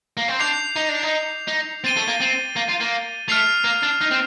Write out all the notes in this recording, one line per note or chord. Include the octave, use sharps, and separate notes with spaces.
A#3
C4
D4 D6 G6 C7 F7
D#4
D4
D#4
D#4
C4 A6 D#7 G7
A3
A#3
C4
A#3
F4
A#3
A3 F6 C7 F7
A#3
D4
D#4
C4